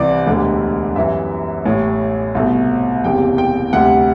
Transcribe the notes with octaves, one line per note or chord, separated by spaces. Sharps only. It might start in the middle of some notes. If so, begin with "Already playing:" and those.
Already playing: C2 C3 E3 G3 D5
E1 D2 D3 G3
F#2 E3 G3 E5
A1 A2 G3
C2 B2 A3
F#1 E2 C3 G3 G5
G5
D2 C3 G3 F#5